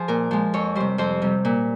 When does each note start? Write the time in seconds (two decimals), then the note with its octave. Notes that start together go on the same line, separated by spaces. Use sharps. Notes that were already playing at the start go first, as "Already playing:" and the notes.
Already playing: F3 G#4 C5
0.08 A#2 A#4
0.31 F3 G#3
0.54 F2 C#5
0.75 C3 G3 C5
0.98 F2 C5
1.22 C3 G3
1.45 A#2